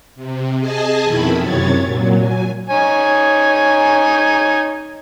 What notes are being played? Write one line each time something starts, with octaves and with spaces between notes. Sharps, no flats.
C3
G#4 D#5 G#5 A5
F2 B2 D#3 E4 B5
F#2 C3 C#5 G#6 A6
A#2 F#3
G#5
D#4 C#5 G#5